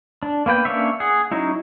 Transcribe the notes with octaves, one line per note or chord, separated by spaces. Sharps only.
D4
A#3 B3 B4 G5
A#3 C#4 D4 C#5 E5
G#4 F#5
F#3 C#4 D#4 E4